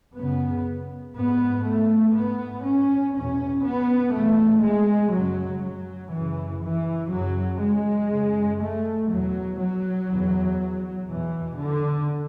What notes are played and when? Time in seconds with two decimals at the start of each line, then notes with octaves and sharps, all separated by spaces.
0.17 F#2 C#3 B3
1.16 G#2 B3
1.66 A3
2.16 G#2 B3
2.65 C#4
3.15 E2 B2 C#4
3.64 B3
4.14 E2 B2 A3
4.65 G#3
5.13 F#2 C#3 F#3
5.64 F#3
6.12 F#2 C#3 E3
6.63 E3
7.12 F#2 C#3 F#3
7.61 G#3
8.12 F#2 C#3
8.61 A3
9.11 E2 B2 F#3
9.61 F#3
10.09 E2 B2
11.09 E2 B2 E3
11.59 D3